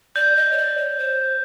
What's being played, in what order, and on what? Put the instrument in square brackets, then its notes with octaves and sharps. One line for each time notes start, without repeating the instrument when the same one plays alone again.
[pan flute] D5 [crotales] G6
[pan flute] D#5
C#5
D5
C#5
C5